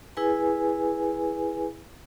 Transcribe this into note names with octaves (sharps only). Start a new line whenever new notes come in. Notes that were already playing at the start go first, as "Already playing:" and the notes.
E4 G#4 B4 G#5